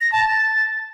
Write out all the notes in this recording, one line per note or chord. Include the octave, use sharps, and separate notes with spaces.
A#6
A5
A6